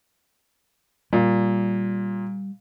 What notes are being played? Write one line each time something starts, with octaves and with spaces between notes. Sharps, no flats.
A#2 G3